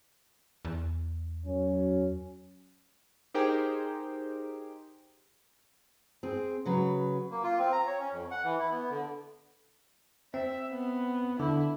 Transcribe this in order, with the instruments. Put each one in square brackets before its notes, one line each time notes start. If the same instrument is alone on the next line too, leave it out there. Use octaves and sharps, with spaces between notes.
[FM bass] E2
[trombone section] F#2 F#3 C#4
[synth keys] D#4 G4 G#4 A#4 C5 G5
[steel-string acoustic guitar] C4 G#4
C#3 F#3 B4
[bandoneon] A#3
F4
C4
A#5
C#5
C#4
F2
F#5
E3
E4
B3
D3
[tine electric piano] C4 [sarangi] E5
[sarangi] B3
[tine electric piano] D3 [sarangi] E4